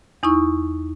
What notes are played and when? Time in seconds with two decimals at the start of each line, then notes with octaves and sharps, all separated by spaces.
0.23 E2 D#4 E4 C#6